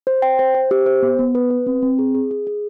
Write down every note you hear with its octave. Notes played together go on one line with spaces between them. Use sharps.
C5
G5
C5
C5
G4
C5
B3
B3
B4
B4
C4
C4
G#4
G#4
G#4
G#4